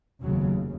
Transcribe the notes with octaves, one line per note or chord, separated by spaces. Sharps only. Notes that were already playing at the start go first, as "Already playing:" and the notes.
F1 D#2 C#3 F#3